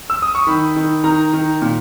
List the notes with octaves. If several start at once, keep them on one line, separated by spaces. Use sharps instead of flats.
E6
D#6
C#6
D#3 B5
D#3
D#3 A#5
D#3
A#2